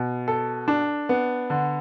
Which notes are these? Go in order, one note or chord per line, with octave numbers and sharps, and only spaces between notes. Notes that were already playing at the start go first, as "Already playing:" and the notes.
Already playing: B2
A4
D4
B3
D3